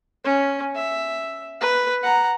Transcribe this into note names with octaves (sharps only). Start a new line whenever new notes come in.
C#4
E5
B4
F#5 A#5